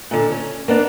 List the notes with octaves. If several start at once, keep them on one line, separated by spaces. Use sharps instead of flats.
A#2 D3
C#4
A#3 B3 D4